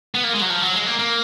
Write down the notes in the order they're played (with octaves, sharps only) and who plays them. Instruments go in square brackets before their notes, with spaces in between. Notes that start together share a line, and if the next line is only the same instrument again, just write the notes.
[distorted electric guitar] B3
A#3
G#3
F#3
F3
F#3
G#3
A#3
A#3